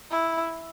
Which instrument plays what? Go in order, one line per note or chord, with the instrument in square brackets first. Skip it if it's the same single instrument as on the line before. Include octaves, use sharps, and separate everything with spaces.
[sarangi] E4